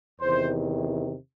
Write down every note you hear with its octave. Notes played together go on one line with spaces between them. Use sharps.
E2 C3 D#3 C5